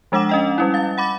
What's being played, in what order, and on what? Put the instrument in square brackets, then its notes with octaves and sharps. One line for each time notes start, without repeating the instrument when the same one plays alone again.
[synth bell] F3 G#3 D4 F#5 D6 E7
C#4 D#5 G5
G3 C#4 E4
F5 A6
F#5 B5 D6 A6